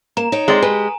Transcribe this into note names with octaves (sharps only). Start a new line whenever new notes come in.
A#3 A#5 E7
D#4 C#5 G5
G#3 C4 D5 C6
G4 B4 G#5